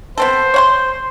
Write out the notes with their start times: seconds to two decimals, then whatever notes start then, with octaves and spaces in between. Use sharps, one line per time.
0.18 B3 C4 A4 C5
0.54 C#5 F#5 C6